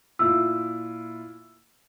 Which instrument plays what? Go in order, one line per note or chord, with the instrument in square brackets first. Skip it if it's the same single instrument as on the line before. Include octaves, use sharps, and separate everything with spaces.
[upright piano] A#2 E4 F4 [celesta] E6